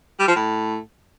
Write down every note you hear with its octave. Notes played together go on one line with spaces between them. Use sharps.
G3
F3
A2